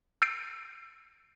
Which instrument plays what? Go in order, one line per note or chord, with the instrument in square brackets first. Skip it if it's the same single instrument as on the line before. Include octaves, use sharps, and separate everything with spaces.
[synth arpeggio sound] E6 G6 A6 C7 D7